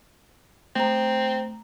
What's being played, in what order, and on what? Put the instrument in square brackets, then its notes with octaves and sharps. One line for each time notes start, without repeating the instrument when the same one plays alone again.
[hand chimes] A3 A#5 [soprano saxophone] C4